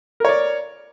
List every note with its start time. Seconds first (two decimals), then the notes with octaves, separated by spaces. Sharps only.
0.20 A#4
0.25 C#5
0.29 D5